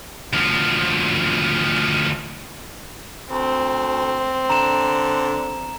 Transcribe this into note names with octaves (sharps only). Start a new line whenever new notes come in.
D2 F3
D2 C4
D3 A#5 E7